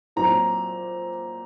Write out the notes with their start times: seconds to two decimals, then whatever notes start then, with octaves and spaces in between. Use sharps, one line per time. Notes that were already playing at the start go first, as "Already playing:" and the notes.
0.16 A#2 F#3 C4 A#5